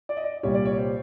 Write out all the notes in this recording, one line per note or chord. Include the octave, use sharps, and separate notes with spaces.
D5
D#5
D5
C2 A#2 G3 C#5
D5
C#5
C5